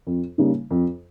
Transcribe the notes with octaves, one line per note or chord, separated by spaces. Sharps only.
F2
C#3 G3 A#3 D#4
F2